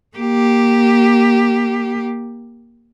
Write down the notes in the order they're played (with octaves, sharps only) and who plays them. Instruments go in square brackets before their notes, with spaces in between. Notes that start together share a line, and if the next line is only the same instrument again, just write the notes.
[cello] A#3 G4